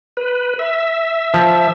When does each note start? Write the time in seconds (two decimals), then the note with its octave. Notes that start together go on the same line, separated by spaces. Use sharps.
0.17 B4
0.59 E5
1.34 F3